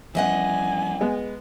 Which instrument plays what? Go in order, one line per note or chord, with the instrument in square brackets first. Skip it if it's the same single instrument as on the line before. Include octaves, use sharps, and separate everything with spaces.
[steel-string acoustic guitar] E2 D#5 F#5 [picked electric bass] F3 G3 C#4 [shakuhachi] G#5
[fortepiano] G#3 B3